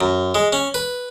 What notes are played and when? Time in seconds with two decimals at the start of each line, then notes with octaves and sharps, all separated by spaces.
0.01 F#2
0.35 G#3
0.53 C#4
0.74 B4